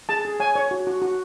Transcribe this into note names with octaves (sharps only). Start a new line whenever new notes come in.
G#4 A5
G#4
C#5 G#5
C#5
F#4
F#4
F#4